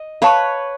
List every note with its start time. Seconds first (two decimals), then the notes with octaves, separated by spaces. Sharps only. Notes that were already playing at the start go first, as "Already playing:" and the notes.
Already playing: D#5
0.22 B4 C#5 F5 A5 C#6